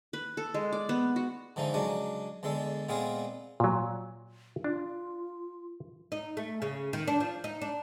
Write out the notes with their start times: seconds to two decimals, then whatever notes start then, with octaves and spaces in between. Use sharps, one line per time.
0.13 B4
0.37 A4
0.54 G#3
0.72 D5
0.89 B3
1.16 F#4
1.56 G#2 D3 E3 F3 D#4
1.74 C#3 F#3 G#3 D4
2.43 E2 D3 G#3 A4
2.89 A#2 G#3 B3 C4 F4 G#4
3.60 A#2 F#3
4.64 D4 F4
6.12 D#4
6.37 A3
6.62 C#3
6.93 D#3
7.08 D4
7.20 F3
7.44 D#4
7.61 D4